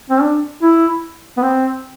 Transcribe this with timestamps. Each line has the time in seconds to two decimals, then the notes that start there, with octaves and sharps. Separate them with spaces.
0.10 C4
0.21 D4
0.62 E4
1.37 B3
1.42 C4